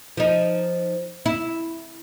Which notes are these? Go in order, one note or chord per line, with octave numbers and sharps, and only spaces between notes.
F3 D#4
E4